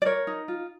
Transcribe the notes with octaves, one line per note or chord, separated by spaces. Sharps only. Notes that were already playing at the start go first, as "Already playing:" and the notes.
D5
A#4 C#5
D#4
F4